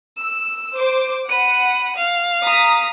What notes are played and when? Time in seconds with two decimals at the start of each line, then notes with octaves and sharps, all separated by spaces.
0.20 E6
0.77 C5 D6
1.29 F#5 B5 D#7
1.97 F5
2.45 A#5 D#6 B6